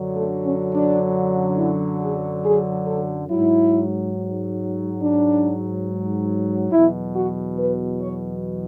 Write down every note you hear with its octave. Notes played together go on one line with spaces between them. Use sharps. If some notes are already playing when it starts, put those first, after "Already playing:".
Already playing: F#2 D3 F#3
A3
C#4
D4
E4
G#4
G#4
A4
G#2 F#3 E4
D4
E2 B2 F#3 E4
F#4
B4
C#5